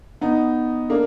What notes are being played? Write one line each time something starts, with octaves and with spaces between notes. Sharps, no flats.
B3 D#4
A#3 D4